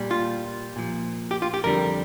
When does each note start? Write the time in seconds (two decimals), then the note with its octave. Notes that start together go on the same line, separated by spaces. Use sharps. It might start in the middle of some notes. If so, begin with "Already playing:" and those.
Already playing: A#2 G3
0.11 F4
0.76 A#2 F3
1.31 G4
1.42 F4
1.54 G4
1.64 F2 D3 G3 A#4